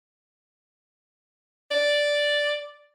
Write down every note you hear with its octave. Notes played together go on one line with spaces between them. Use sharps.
D5